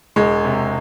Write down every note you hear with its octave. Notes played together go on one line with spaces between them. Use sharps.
E1 G#3
C3